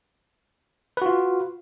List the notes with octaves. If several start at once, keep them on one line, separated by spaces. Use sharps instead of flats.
F4 F#4 B4